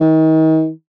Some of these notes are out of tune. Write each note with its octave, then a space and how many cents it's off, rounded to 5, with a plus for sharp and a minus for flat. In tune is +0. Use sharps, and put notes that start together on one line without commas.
D#3 +35